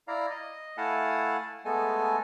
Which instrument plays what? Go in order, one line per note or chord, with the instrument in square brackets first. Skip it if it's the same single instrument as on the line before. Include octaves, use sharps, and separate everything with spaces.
[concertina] E4 D5 F5 A#5
D#5
A3 E4 F5 F#5 G#5 A5
G#3 A3 B3 A4 G#5